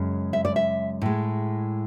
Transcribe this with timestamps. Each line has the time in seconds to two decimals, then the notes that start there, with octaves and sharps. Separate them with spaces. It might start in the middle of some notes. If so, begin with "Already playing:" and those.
Already playing: F#2 C#3 G#3
0.33 E5
0.45 D5
0.56 E5
1.02 A2 G#3